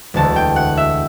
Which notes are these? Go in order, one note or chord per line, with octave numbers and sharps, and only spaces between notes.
E1 D2 D3 A5
G5
F#5
E5